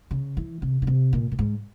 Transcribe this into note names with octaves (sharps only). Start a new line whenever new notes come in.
C#3
E3
C3
C#3
C3
A#2
A#2
G#2